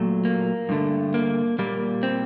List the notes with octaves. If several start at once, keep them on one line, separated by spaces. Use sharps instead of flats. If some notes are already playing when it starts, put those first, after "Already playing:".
Already playing: A#2 F#3 A3
A#3
G2 D3 A3
A#3
A#2 G3 A#3
C4